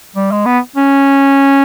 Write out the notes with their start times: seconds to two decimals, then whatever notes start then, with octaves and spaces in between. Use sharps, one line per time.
0.16 G3
0.31 G#3
0.45 B3
0.76 C#4